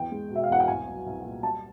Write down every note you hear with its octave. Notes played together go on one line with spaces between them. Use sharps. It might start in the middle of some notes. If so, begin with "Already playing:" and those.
Already playing: E2 G5
G#3
B2
E5
F5
E2 F#5
G5
C2 G#5
F#3
C2
A#2
G3 A5